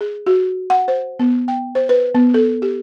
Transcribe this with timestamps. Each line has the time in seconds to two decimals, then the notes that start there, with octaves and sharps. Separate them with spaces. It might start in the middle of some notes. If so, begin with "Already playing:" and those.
0.01 G#4
0.26 F#4
0.70 F#5
0.88 C5
1.19 B3
1.48 G5
1.75 C5
1.89 B4
2.15 B3
2.34 A4
2.62 G4